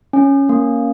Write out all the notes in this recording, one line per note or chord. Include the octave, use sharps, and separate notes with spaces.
C#4
A#3